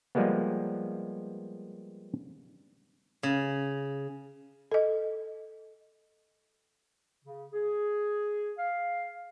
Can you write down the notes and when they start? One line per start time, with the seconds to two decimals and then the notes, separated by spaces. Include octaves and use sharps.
0.15 F3 G3 G#3 A#3 B3
3.23 C#3
4.71 A4 D#5
7.24 C#3
7.53 G#4
8.59 F5